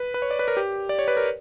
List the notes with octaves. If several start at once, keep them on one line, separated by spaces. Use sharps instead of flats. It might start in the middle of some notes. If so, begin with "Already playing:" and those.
Already playing: B4
B4
C#5
D5
B4
A#4
G4
D5
C#5
B4
A#4